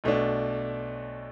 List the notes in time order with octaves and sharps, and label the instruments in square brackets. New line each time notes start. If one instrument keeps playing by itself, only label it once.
[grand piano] B1 B2 A3 D4